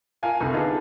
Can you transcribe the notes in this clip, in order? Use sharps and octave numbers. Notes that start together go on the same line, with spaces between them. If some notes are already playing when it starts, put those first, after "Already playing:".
F4 A#4 F5 G#5 A5
C2 D3
D4 D#4 F4 G#4 A4 B4